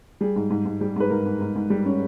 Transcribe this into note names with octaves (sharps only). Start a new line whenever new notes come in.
G3 G#4
G#2
G#2
G#2
G3
G#2 B4
G#2 A#4
G#2
G#2
G#2
G3
C#4